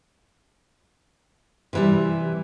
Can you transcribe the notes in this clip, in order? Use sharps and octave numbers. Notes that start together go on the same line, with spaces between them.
C3 E3 G3